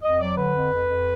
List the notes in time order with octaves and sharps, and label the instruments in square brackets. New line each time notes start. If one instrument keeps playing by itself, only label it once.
[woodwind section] F2 D#5
F#3 D5
D3 B4
F2
F2
F2